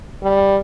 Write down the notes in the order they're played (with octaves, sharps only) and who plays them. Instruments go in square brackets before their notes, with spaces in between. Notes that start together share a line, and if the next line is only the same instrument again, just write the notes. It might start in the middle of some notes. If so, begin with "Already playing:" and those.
[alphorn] G3